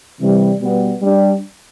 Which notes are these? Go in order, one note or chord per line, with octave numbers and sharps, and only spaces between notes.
C3 E3 G3
B2 G3 B3
G3 D4 G4